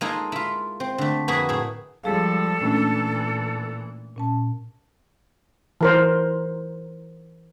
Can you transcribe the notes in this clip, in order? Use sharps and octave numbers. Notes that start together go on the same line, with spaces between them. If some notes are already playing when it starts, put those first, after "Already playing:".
G#3 A#3 D#4 F4 A4
E4 F4
C4
D3 A3
F2 A#3 F#4 G#4 B4 B5
A2 E4 G#4
F3 G3 G#3 G#4 A4 F5
A#2 E3 A3 C#4 D4
A#2 C#4 A5
E3 A#4 C5